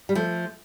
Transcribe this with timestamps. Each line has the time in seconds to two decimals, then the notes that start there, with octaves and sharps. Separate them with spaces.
0.09 G3
0.15 F3 A3